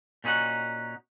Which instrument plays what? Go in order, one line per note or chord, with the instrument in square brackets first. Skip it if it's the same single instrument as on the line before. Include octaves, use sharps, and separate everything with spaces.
[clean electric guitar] A#2 C#4 D#4 F#4 F#5